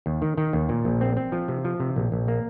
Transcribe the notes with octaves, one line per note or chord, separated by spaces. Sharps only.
D#2
D#3
D#3
D#2
A#2
A#1
C4
C4
F3
C3
F3
C3
A#1
A#1
A#3